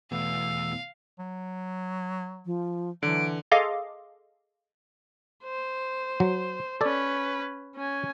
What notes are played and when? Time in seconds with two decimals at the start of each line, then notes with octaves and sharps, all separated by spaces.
0.12 E2 B2 A3 B3 F5 E6
1.19 F#3
2.46 F3
3.03 D3 E3 F#3 D7
3.51 G#4 A4 D#5 F5 C6 D6
5.44 C5
6.20 F#3
6.81 C#4 A4 B4 D5
7.76 C#4 G#5